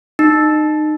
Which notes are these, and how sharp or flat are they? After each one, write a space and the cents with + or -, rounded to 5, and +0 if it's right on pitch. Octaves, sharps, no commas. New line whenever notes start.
D#4 -25